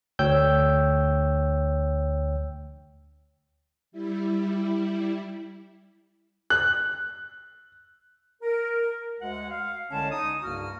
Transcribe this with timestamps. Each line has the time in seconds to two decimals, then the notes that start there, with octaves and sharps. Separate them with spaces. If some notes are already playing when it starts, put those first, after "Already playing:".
0.19 D2 C#5 G5 E6 G6
3.92 G3 E4
6.50 F#6
8.42 A#4
9.20 D2 G#3 F#5
9.50 F5
9.91 C2 D3 G#3 C#4 C#5 A5
10.11 D#4 D#6
10.42 C2 G2 C#3 A#3 F#4 F6